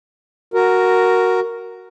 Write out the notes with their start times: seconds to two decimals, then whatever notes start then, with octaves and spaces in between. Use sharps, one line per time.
0.54 F#4 A#4